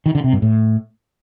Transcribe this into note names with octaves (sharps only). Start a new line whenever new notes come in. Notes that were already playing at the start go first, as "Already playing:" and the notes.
D#3
D3
C3
G2
A2